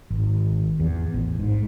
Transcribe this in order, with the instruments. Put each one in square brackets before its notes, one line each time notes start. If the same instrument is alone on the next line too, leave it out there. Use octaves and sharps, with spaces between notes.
[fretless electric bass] G#1
E2
A1
G#2